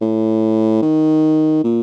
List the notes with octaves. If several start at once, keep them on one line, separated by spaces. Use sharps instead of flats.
A2
D#3
A#2